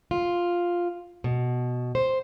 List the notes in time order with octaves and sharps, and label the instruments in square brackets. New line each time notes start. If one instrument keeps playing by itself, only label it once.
[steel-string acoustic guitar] F4
B2
C5